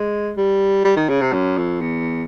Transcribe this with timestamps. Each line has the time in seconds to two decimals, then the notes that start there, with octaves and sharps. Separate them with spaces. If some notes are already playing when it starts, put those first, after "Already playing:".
Already playing: G#3
0.37 G3
0.84 G3
0.97 D#3
1.09 C#3
1.21 C3
1.33 F#2
1.57 F2
1.81 E2